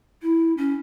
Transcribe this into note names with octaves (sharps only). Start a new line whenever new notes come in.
E4
C#4